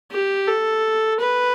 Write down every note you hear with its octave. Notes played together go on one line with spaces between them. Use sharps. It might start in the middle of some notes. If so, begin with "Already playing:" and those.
G4
A4
B4